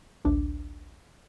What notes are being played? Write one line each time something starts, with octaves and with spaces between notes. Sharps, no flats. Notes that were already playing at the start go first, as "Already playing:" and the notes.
A1 D2 A2 D4 D6